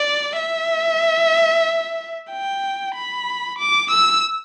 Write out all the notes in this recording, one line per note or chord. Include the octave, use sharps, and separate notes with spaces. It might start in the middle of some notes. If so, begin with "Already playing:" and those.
Already playing: D5
E5
G5
B5
D6
E6